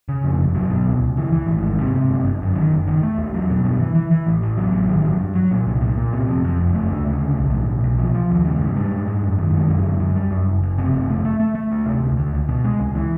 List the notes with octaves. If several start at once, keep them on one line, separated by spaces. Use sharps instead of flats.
C#3
F2
G1
F#3
B2
C#2
C#2
E3
E3
G#1
G#2
C3
C3
G1
G1
F#2
D#3
F#1
D#3
A3
E2
F#3
B2
G2
E3
E3
E3
A1
A1
F#3
A1
D#3
F#3
G2
F#3
A#2
C2
A#2
A#2
C3
F2
F2
F#1
A3
D2
C#3
D2
B1
A2
B1
B1
F3
F3
D#2
C#3
G#2
G3
G#2
G#2
F#2
D#3
G#3
F#2
D3
F#2
G3
F#2
F#1
F#1
C3
F#1
A3
A3
A3
A3
D2
C3
D2
D2
C#2
B2
G#3
C#2
E3